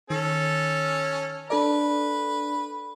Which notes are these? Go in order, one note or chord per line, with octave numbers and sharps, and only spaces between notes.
D#3 C#4 A4
D4 A4 B4 D5